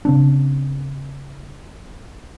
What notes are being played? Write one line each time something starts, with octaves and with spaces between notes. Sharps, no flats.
C#3 C4 D4